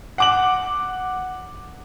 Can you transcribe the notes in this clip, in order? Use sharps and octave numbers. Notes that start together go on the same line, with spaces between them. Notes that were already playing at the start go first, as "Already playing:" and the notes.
F#5 D6 F#7